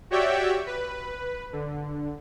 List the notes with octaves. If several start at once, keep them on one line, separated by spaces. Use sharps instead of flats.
F#4 G4 C#5 D5 E5 G5
B4
D3